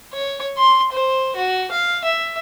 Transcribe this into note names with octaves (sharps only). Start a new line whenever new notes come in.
C#5
C6
C5
F#4
F5
E5